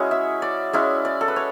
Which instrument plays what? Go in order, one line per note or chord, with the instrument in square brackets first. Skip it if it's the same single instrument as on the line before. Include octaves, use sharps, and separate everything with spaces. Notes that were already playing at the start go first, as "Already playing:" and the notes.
Already playing: [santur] G#3 C#4 E4 F#4 G#4
E5
D5
G#3 C#4 E4 D5
D5
A4
B4
C#5